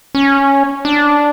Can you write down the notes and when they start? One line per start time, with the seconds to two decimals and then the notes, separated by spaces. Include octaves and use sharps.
0.15 C#4
0.85 D4